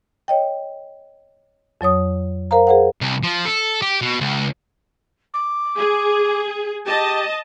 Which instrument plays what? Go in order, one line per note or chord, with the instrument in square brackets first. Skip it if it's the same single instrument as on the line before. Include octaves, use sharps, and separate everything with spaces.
[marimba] C#5 D#5 G5
F2 F#3 C#5 D#6
A#4 C5 F5 A#5
G#4 A#4 C5 F5 F#5
[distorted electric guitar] C2
F3
A4
G4
B2
C#2
[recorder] D6
[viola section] G#4
[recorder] G4 [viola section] D#5 A5